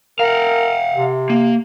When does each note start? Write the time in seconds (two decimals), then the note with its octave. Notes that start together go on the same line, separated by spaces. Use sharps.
0.19 A#4 F5 F#5
0.94 C3
1.30 A#3